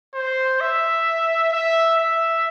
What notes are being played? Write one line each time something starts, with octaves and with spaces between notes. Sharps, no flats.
C5
E5
E5
E5